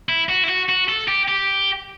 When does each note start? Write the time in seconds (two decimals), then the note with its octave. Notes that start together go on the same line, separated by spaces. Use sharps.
0.09 E4
0.29 F#4
0.44 E4
0.48 F#4
0.69 F#4
0.89 A4
1.08 G4
1.28 G4